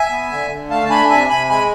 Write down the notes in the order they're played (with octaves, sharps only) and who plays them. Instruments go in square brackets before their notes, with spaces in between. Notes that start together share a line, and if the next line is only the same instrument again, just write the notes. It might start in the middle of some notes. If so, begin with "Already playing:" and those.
Already playing: [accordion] E5 G#5
B3
D3
D3
A3 F5 A5
A5
D4 G#5 B5
C3 E5 G#5
C3 G#5 B5
G#3 G#5 B5